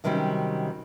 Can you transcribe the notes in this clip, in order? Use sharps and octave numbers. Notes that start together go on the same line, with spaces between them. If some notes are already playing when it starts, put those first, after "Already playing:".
C3 D#3 F#3 G3 C4 C#4